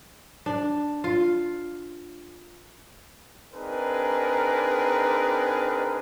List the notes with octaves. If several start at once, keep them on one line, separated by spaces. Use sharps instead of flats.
D4
F4
C4 D4 D#4 G#4 A#4 B4